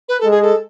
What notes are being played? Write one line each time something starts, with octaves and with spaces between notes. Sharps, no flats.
B4
G#3 A4
G#4
A4